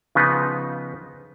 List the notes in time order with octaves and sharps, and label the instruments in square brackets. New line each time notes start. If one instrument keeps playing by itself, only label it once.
[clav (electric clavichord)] C#3 F3 B3 D#4 B4